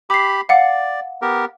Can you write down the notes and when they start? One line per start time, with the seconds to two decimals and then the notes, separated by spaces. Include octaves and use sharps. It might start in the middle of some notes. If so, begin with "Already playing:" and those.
0.10 G4 B5 D6 C7
0.49 D5 F5 F#5 D6
1.22 B3 G4 A#4